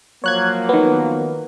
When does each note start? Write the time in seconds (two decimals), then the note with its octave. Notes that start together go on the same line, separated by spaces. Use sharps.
0.24 F3 F#3 A#3 C#5 F#6 G#6
0.69 D#3 B3